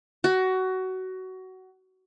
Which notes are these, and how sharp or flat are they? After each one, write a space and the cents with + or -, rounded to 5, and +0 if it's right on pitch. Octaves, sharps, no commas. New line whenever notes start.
F#4 +20